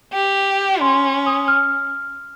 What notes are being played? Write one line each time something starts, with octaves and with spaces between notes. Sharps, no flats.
G4
C#4 C6
D#6
F6